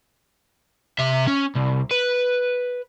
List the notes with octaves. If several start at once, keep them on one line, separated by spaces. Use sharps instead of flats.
C3 E5
C#4
C2
B4